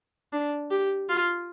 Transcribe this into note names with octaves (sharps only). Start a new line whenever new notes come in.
D4
G4
F4